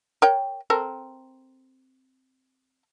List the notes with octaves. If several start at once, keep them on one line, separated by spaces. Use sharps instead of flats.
A#4 C#5 G5
C4 A4 A#4